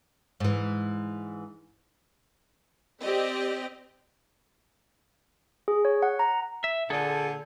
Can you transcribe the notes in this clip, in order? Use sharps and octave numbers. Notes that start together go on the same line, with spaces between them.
G#2 E3
C4 G4 D5 D#5
G#4
C#5
F#5
A#5
E5
A#2 D3 G#4 A4